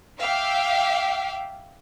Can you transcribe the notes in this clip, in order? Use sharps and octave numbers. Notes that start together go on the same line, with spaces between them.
E5 F5 G5 D6